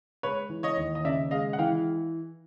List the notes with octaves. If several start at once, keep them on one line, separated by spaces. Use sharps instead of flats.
G#3 B4 C#5
E3
C#5 D#5
D#2
D#5
C#3 D5 E5
G#3 D#5 F5
F#5
E3 F5 G5